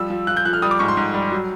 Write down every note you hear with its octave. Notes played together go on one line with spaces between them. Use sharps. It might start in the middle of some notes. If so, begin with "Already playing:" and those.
Already playing: F3 G3 E6
F3
F3 F#6
G6
F3 F#6
F6
G3 D#6
D6
G#2 C#6
C6
G#2
G3
F#3